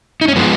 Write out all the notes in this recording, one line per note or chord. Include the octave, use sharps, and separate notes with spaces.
D#4
C#4
F3 G#3 B3